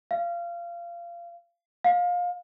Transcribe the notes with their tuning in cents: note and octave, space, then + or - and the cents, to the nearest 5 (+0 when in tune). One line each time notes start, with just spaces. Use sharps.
F5 -25
F5 +25